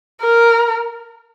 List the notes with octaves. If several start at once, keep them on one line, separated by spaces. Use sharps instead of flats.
A#4